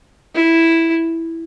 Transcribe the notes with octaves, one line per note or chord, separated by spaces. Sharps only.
E4